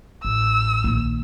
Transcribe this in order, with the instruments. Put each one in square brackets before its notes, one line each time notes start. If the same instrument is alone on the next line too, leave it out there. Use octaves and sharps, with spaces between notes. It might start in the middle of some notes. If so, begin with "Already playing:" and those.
[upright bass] A1 [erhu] E6
[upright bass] A#1 D#3